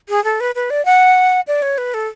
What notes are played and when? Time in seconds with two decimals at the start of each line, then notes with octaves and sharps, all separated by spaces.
0.09 G#4
0.24 A4
0.40 B4
0.55 B4
0.70 D5
0.85 F#5
1.47 D5
1.62 C#5
1.78 B4
1.94 A4